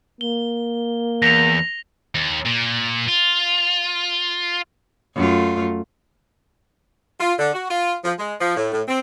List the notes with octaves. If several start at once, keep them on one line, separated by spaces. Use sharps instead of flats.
A#3 G7
E2 A#6 F7
D#2
A#2
F4
F#2 A3 F4
F4
D3
F#4
F4
F3
G#3
F3
A2
A2
C4